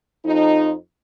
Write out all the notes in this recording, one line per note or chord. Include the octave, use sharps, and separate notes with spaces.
F2 D#4